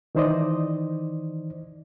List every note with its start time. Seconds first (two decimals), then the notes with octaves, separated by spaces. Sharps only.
0.15 D#3 E3 D#4 C5 D5 D#5